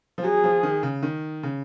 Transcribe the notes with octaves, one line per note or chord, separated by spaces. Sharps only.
F3
F#3 G#4
F3
D#3
C#3
D#3
C#3